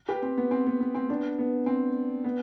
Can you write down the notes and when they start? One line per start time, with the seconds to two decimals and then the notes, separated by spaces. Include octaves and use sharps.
0.08 G4 B4
0.22 C4
0.37 B3
0.51 C4
0.67 B3
0.81 B3
0.95 C4
1.09 B3 D4
1.39 B3
1.66 C4
2.24 B3